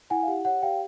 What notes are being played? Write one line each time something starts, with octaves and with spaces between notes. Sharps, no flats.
E4 F#5 G#5
F5
G4 F#5
C#5 F#5
G4 F5 G5